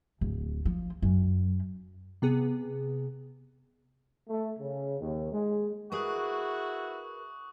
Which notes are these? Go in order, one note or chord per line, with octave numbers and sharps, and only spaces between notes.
D1
F3
F#2
C3 B3 G#4
A3
C#3
D#2
G#3
E4 F#4 G#4 A#4 B4 C#6 D#6 F#6